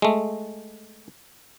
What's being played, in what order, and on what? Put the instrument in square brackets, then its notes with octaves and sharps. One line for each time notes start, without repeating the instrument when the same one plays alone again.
[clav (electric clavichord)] G#3 A3